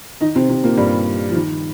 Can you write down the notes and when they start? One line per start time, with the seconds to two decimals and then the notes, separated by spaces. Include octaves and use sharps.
0.21 D#3 D#4
0.35 C3 C4
0.49 C3 C4
0.63 A#2 A#3
0.77 G2 G3
1.29 F3
1.35 D#3